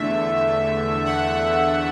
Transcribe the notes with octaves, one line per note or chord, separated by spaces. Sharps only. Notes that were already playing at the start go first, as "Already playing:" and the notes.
Already playing: E2 D3 A3 E5
F#5